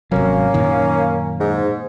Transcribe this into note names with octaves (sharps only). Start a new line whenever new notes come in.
G#1 C3 F#3 A#3 C#4
F#2 A#2 D#3
G#2